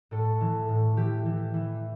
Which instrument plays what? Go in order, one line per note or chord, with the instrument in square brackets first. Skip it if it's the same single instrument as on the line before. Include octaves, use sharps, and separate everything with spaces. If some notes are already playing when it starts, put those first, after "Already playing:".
[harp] A2 A4
E3
A2
E3 G4
E3
E3